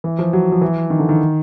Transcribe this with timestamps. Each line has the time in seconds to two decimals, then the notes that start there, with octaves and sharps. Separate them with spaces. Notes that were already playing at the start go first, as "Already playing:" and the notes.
0.04 E3
0.19 F3
0.33 F#3
0.52 F3
0.61 E3
0.90 D#3
0.99 D3
1.09 D#3